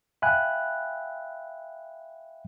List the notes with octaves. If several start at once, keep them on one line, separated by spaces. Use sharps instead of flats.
E5 F5 G5 G#5 B5 F#6